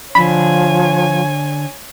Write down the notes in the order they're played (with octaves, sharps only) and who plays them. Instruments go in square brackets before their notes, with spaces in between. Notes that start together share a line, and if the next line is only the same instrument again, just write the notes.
[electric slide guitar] D3 D4 [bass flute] F3 [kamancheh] C#5 G#5 [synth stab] B5